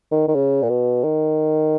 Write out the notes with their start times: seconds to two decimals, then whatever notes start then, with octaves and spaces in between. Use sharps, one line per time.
0.11 D#3
0.28 D#3
0.35 C#3
0.63 A#2
0.70 B2
1.04 D#3